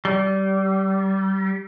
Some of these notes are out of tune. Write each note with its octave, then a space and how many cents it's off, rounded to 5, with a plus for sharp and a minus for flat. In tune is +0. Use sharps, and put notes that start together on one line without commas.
G3 -25